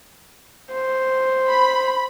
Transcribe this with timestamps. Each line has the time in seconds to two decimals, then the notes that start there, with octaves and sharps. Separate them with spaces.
0.72 C5
1.48 B5